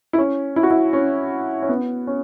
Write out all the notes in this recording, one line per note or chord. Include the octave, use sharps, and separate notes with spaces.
E4
C#4
E4
F#4
E4
C#4
C#4
B3
C#4